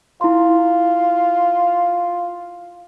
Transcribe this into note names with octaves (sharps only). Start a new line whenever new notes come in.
E4 F4 C6